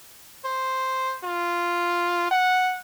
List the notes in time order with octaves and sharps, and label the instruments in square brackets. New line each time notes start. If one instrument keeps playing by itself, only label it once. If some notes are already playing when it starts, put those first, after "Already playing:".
[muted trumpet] C5
F4
F#5